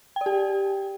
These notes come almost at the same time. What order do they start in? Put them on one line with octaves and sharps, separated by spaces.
G5 D5 G4